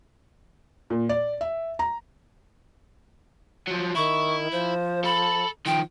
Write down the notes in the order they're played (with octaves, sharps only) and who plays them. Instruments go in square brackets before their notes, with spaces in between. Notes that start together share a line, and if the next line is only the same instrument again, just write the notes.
[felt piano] A#2
D5
E5
A#5
[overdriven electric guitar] F3 F#3
[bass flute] D#3 [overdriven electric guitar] E4 [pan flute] C#6
[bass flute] F3 [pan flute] C5
[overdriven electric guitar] A4 A5 [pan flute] B5
[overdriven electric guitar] D#3 F3 [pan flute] G5